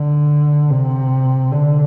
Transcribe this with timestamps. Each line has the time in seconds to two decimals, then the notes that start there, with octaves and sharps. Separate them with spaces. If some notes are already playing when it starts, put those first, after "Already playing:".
Already playing: D3
0.70 C3
1.51 D3